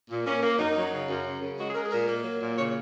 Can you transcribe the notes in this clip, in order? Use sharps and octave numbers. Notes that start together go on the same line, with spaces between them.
A#2
A#3 C#4
A#3
F#2 D#4
F#3
C#3
F#2
C#3
C#3
G#3 F#4
G#4
G#3 A#4
G#4
A#2 A#4
A#3
F#3
A#2
C#3 C#5